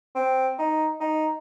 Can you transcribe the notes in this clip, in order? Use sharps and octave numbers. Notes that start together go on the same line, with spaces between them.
C4
D#4
D#4